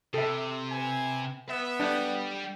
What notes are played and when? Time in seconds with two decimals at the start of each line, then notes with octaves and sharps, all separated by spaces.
0.14 C3 A4 E5
0.72 B4 G#5
1.49 B3 E5
1.80 G3 D4 G4